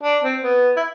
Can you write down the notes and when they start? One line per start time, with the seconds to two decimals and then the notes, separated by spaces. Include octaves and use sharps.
0.03 D4
0.23 C4
0.42 B3
0.77 E4